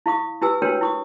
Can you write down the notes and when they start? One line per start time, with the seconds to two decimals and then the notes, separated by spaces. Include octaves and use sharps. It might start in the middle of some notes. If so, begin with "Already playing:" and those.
0.06 E4 F5 C#6 D#6
0.42 E4 G4 B4 G#5 E6
0.62 D4 F#4 A#4 B4 C#5 G5
0.81 E4 C#6 D#6